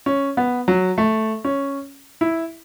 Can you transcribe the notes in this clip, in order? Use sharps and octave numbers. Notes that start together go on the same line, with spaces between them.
C#4
B3
F#3
A3
C#4
E4